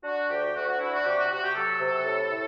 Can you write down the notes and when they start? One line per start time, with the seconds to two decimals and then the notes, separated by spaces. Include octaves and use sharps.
0.04 D4 F#4
0.29 D2 G4
0.54 D2 F#4
0.67 F#4
0.79 D4 E4
0.92 F#4
1.05 C3 G4
1.17 F#4
1.30 C3 F#4
1.42 G4
1.55 F#3 A4
1.80 C3
2.05 A2
2.31 A2